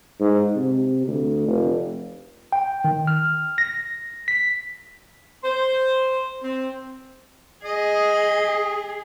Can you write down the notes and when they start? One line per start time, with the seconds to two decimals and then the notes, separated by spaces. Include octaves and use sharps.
0.20 G#2
0.56 C3
1.07 D2
1.48 F1
2.52 G5
2.84 D#3
3.07 F6
3.58 A#6
4.28 B6
5.43 C5
6.42 C4
7.65 G#4 D#5